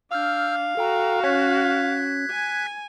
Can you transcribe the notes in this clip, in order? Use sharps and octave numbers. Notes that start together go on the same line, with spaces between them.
D4 F5 E6 F6 G6
F#4 A4 G5 A#5
C#4 F#6 G#6 B6
G#5